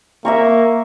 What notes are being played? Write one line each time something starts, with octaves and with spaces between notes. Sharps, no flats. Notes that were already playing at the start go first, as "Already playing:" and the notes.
A#3 E5 A#5 C#6